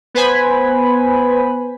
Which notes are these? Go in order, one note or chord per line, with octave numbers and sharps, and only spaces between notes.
B3 B4 C5 G#5 B5